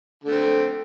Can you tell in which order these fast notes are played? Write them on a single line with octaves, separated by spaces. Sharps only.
D3 A3 C4